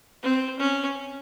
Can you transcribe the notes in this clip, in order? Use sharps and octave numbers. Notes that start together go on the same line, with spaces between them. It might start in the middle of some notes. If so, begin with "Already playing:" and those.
C4
C#4